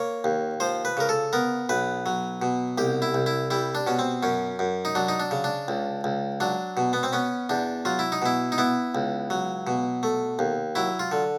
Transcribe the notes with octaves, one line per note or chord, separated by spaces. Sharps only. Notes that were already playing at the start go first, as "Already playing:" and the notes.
Already playing: A#3 C#5
D#2
F3 C5
B4
C#3 A#4
A4
B3 A#4
B1 B4
F#3
B2
C2 G4
E4
C2
E4
G3 E4
D4
B2 C#4
C4
F#2 C#4
F#2
D#4
F#3 D4
D#4
D4
C#3
D4
C#2
C#2
F#3 D4
B2
B3
C4
B3 C#4
E2 D4
F#3 F4
E4
D#4
B2 E4
D#4
B3 E4
C#2
F#3
B2
A3
D#2
F#3 E4
F4
D3